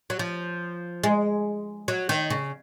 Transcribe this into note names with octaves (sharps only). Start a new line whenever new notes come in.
F#3
F3
G#3
F#3
D#3
C#3